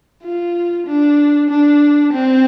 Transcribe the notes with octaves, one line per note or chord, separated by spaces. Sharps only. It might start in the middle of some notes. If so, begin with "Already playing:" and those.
F4
D4
D4
C4